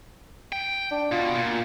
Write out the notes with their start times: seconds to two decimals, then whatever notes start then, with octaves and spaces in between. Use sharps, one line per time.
0.52 G5
0.91 D4
1.12 B2 F4
1.35 A#2